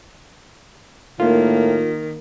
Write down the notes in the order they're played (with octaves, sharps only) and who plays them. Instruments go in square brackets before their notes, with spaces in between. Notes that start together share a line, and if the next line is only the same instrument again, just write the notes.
[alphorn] A2 [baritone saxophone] D#3 [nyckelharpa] A#3 [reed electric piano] F4